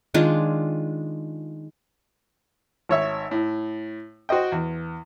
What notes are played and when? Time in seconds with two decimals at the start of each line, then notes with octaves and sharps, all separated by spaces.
0.14 D#3 G#3 D4 F4
2.89 G#1 C#5 E5
3.31 A2
4.29 F#4 C5 D#5 G5
4.52 E2